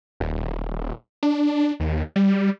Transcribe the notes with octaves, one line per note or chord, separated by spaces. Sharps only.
D#1
D4
D#2
G3